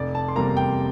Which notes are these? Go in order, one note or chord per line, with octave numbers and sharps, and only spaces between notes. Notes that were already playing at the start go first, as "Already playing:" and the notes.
Already playing: F1 D5
A5
C6
E2 C3 G3 A#3 A#5
G5